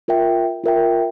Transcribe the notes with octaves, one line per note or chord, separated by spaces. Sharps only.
F4 A#4 E5 G5
F4 A#4 E5 G5